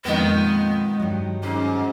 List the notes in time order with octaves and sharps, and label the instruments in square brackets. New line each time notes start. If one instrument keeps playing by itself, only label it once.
[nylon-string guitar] F2 A#2 D#5 [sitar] D#3 B3 [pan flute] G#3
[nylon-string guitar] G2 D#3 F#3
[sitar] G#2 [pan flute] C#4